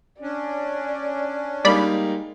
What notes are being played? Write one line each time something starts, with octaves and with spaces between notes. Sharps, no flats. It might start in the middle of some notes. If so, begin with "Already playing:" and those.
C#4 D4 D5
G3 G#3 A#3 D#4 D5 B5